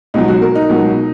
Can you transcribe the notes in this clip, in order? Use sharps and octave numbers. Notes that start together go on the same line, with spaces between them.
C#2 B2 F#3 D#4
F#4
A#4
D#4
C#2 B2 F#3